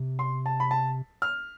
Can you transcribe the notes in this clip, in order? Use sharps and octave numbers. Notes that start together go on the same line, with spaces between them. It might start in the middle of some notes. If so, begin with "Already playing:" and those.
Already playing: C3
C6
A5
B5
A5
F6